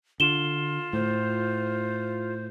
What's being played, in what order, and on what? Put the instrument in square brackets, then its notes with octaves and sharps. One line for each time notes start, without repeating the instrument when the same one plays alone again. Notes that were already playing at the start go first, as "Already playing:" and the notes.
[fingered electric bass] D3 [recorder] F4 [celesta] E7 G7
[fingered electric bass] A2 [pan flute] C5